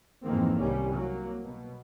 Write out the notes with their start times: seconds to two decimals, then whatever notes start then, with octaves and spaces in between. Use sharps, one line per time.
0.23 F2 G#2 D#3 E3 A#3 C4
0.58 C2 G3 C#4
0.95 F#3 A#3
1.43 B2